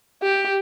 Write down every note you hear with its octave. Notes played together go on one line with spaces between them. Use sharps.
G4